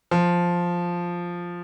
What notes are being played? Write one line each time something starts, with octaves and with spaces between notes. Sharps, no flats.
F3